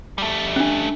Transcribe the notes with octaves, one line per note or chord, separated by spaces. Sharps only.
G3 A3
C#4 D4